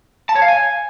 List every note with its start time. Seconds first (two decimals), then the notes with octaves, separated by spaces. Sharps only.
0.29 A5
0.35 C#5
0.42 F5
0.48 G#5